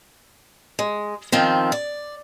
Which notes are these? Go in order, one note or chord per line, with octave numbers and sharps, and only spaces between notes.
G#3
D#3 F3 C4
D5